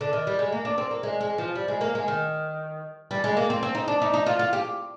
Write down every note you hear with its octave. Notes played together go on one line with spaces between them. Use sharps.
D3
D#3
G3
G#3
A#3
D4
C4
A#3
G#3
G#3
F3
G3
G#3
A#3
G#3
D#3
G3
G#3
A#3
C4
C4
D#4
D4
D#4
D#4
F4
F4
G4